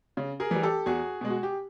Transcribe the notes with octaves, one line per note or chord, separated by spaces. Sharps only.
C#3
G#4 A#4
E3 G3
G4 A4
E2 F#4 G#4
B2 G#3
F#4
G4